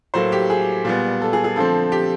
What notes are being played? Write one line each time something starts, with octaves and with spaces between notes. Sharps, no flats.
A2 F#3 A#3 C5
G4
G#4
A#2 G3 B3
A4
G#4
G#4
D3 F3 A3 C4 A4
G4